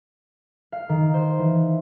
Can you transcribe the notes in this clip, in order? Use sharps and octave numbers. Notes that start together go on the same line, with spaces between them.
F5
D#3
C5
E3